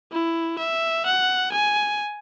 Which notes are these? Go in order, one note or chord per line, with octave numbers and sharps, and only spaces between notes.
E4
E5
F#5
G#5